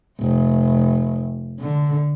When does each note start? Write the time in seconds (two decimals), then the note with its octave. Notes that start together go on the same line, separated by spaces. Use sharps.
0.20 F1
1.60 D3